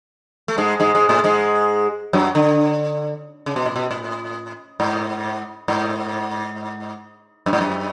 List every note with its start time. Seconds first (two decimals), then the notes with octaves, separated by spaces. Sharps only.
0.48 A3
0.58 G#2 G#3
0.80 G#2 G#3
0.95 G#2 G#3
1.09 A2 A3
1.24 G#2 G#3
2.13 F#2 F#3
2.35 D3
3.46 C#3
3.56 B2
3.65 A2
3.76 B2
3.91 A2
4.80 G#2
5.68 G#2
7.46 F#2
7.53 G#2
7.61 F#2